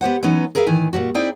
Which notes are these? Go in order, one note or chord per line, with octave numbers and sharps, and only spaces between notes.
B3 G4 C5 F#5
E3 F#3 B3 C#4 D#4
G#4 A#4 B4 E5 F5
A2 D#3 E3 G#5
A#2 F#3 G3 F#4
C4 D#4 E4 G#4 D5 G5